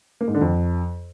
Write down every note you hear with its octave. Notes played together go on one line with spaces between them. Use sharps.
A#3
G#2
D3
F2